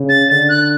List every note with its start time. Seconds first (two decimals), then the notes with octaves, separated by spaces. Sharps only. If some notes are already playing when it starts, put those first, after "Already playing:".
Already playing: C#3
0.08 A6
0.28 D3 A6
0.48 F#6